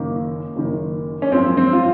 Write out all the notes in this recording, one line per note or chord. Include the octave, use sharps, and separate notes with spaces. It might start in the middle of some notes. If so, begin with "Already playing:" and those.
Already playing: F#1 F#2 D#3 A#3
F#1 F#2 D#3
C#4
G#1 F#2 F3 C4
C4
F4